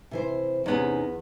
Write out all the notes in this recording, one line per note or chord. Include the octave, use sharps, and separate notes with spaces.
C3 E3 C5
E2 C3 B3 C#4 D#4